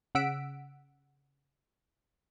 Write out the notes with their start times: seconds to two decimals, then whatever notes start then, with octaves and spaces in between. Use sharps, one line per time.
0.15 C#3 F#5 E6 B6 D7